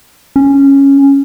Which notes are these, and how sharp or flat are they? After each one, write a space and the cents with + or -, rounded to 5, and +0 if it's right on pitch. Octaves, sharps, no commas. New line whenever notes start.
C#4 -5